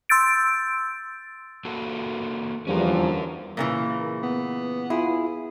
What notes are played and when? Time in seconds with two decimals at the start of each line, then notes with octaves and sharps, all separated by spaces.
0.09 C6 E6 G6 A6 D7
1.65 A#3 F#4 A4
2.67 E2 D3 E3 F3 G3 C#4 A#4
3.57 A#2 C#3 E3 A#3
4.23 B3
4.90 E4 F4 G#4